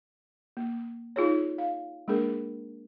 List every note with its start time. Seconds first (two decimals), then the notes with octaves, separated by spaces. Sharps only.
0.57 A#3
1.16 D#4 F4 G#4 C#5
1.58 F5
2.08 G#3 A#3 D4 G#4 A#4